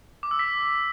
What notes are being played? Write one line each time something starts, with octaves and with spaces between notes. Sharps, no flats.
D6
E6
B6